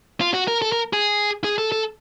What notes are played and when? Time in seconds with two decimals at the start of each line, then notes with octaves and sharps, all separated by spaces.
0.20 F4
0.34 F#4
0.48 A#4
0.62 A4
0.72 A#4
0.93 G#4
1.44 G#4
1.58 A4
1.72 A4